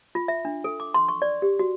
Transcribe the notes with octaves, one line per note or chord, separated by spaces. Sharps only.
F4
E5
D4
A4
D6
C6
C#6
D5
G4
F#4